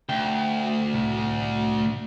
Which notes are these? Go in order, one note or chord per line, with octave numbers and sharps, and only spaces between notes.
D2 G5
C2 A2